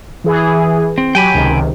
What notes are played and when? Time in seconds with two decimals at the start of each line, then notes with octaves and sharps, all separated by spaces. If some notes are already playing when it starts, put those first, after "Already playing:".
0.24 E3 G#4
0.98 C4
1.15 F#3 G4 G5 G#5 B5
1.33 C#2 C3 D#3